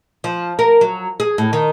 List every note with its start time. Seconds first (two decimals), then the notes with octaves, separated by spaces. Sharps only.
0.24 F3
0.59 A#4
0.81 F#3
1.20 G#4
1.38 A2
1.53 D#3